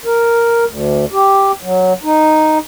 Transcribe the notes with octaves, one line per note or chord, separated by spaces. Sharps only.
A#4
D2
G4
F#3
D#4